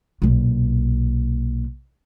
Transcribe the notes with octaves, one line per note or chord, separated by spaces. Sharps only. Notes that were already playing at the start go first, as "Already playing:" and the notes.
B1 A#2